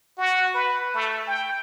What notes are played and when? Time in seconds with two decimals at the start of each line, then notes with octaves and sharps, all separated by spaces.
0.17 F#4
0.54 B4
0.94 A3
1.27 G5